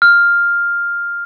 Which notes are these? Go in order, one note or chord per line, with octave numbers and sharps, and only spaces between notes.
F6